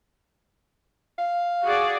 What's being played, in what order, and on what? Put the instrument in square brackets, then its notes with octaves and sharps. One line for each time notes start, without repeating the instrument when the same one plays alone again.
[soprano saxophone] F5
[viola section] F#4 G#4 D5